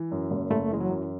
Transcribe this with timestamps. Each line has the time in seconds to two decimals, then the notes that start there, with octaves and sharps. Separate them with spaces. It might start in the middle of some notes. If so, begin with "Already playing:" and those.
Already playing: E3
0.11 F#2
0.31 F#1
0.50 F#1 A3
0.70 E3 G#3
0.80 F#3
0.90 F#2